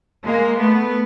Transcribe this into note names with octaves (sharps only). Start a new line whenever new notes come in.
G#3 A#3
A3 B3